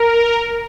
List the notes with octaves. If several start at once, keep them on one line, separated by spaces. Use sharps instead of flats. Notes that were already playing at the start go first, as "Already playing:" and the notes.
Already playing: A#4